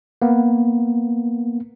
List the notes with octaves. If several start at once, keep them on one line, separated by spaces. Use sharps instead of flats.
A#3 B3